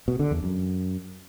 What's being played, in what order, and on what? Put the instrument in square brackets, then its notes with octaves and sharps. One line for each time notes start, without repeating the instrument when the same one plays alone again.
[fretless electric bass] B2
D3
E2
F#2